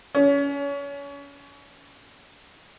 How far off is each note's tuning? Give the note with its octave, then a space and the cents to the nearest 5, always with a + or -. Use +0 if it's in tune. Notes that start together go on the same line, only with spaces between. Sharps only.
C#4 +30